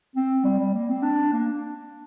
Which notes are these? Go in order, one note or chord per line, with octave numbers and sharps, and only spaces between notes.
C4
G3
G3
A#3
C4
D4
A#3